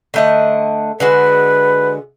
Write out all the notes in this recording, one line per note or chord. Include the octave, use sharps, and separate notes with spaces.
D3 A3 D#5
D3 G#3 F#4 B4